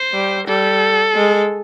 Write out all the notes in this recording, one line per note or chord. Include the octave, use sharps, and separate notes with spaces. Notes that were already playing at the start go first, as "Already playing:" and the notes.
Already playing: C5
G3
G3 A4
G#3